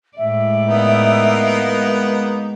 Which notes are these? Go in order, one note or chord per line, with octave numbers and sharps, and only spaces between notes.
A2 G#3 D5 E5
A#3 B3 D#4
G#3